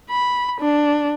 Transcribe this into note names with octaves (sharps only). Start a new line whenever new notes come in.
B5
D4